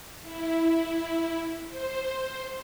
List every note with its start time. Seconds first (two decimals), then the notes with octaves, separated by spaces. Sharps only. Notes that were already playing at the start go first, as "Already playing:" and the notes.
0.22 E4
1.68 C5